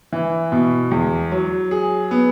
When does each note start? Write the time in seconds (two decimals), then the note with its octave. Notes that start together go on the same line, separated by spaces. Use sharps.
0.13 E3
0.52 B2
0.91 E2
1.32 F#3
1.71 G#4
2.11 B3